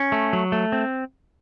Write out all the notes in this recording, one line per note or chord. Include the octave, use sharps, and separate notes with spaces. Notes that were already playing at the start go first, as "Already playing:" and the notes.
Already playing: C#4
A3
F#3
A3
C4